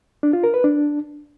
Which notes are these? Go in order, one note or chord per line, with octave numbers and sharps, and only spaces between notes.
D4
F4
A#4
B4
D4